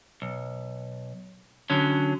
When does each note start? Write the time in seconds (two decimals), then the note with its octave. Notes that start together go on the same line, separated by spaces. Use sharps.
0.22 B1
1.70 D3 F#3 C#4